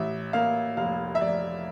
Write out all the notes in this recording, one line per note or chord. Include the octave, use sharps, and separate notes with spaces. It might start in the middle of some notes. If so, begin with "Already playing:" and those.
Already playing: A1 E5
A#3 F5
F1 F5
E5
F1 D5